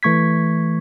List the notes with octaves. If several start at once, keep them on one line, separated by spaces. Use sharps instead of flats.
E3 A3 C#6 G#6 B6